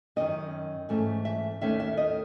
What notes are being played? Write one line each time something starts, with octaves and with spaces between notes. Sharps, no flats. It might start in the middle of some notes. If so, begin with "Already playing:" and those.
F#2 D#3 G#3 C#4 D#5
G#2 E3 A3 C#4
E5
D#2 D#3 A3 C#4 E5
E5
D#5